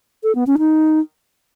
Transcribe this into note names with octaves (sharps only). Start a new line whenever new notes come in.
A4
B3
C#4
D#4